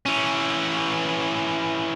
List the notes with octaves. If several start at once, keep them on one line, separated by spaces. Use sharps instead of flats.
E3 C#4